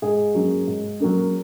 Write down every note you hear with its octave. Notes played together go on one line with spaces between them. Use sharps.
G#2 G#4
F#3 A#3 C#4
G#2
F#3 A#3 C#4